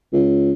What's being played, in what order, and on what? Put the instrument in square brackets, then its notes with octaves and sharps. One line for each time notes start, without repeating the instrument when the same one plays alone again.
[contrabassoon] C#2